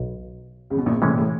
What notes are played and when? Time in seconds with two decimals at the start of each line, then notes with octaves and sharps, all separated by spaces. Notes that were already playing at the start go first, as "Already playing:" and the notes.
Already playing: B1
0.70 C#2 C#3
0.78 B2
0.86 A#1 A#2
1.02 A2 C3 E3 G#3 C#4
1.10 A#2
1.18 A2